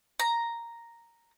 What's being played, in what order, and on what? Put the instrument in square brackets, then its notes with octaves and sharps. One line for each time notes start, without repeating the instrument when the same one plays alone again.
[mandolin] A#5